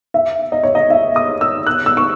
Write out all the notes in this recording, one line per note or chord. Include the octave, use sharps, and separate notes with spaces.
E5
D#5
C#5
D#5
E5
D#6
E6
F#6
E6
C#6